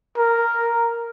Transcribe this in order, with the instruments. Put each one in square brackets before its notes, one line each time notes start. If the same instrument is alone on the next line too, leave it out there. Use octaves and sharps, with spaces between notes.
[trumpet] A#4